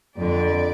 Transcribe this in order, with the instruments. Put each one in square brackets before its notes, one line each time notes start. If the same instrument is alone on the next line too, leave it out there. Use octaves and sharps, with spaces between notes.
[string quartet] F2 D3 D5